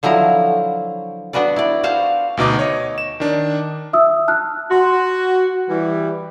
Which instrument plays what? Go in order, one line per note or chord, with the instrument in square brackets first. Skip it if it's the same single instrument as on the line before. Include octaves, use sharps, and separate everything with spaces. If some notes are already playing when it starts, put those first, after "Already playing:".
[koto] D3 F3 F#3 E4 A#5
B3 D4 F#4 B4 D5
E4 D5
F#4 C5 F5 A5
[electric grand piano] D2 B2 D#4 D6
C#5 D#5
E7
D#3 D4
[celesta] E5 D#6 E6
A5 F6 F#6
[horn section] F#4 [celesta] C6
[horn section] E3 G3